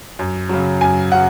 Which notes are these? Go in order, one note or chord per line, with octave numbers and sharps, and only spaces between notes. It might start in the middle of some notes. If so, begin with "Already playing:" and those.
F#2
C#3 F#3
F#2 G#5
C#3 F#3 F#5